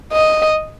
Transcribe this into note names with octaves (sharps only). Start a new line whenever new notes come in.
D#5